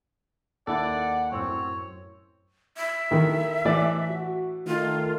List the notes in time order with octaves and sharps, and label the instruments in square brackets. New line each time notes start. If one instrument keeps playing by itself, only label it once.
[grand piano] D#2 D#3 [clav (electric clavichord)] E4 A4 [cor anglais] D5 [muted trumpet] F#5
[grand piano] F#2 A2 E6 [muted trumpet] C4 [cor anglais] C#5
[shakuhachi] E5
[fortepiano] D#3 E4 A4
A2 E3 D5
[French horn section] F#4
[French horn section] D#3 A3 [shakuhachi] F4